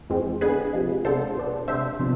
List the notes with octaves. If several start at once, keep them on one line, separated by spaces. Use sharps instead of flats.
F2 E3 G#3 C4
D3 G#3 B3 G#4 B4
C3 F3 G#3
C3 G#3 B3 D4 A4 C5
B2 B3 D4
C3 G#3 D4 C5 E5
C3 F3 B3 D4